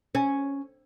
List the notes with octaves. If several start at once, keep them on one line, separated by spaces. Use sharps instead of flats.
C#4